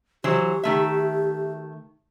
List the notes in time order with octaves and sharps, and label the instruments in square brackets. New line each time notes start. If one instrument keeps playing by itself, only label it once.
[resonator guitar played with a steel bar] E3 F#3 C5 [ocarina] G4
[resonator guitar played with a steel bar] D#3 A3 E5